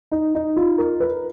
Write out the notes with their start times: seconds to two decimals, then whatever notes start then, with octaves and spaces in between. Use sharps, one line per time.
0.12 D#4
0.35 D#4
0.56 F4
0.78 A#4
1.00 B4